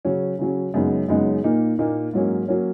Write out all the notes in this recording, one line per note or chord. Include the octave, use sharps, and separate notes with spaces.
C#3 F#3 C#4
C#3 F#3 C#4
F#2 C#3 G#3 B3 D#4
F#2 C#3 G#3 B3 D#4
A#2 A#3 D#4
A#2 A#3 D#4
G#2 F#3 A#3 C#4
F#3 A#3 C#4